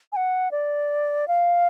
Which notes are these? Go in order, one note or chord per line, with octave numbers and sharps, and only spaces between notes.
G#5
F#5
D5
F5